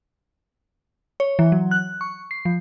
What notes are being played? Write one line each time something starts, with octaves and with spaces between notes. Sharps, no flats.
C#5
E3
F#3
F#6
C#6
C7
F3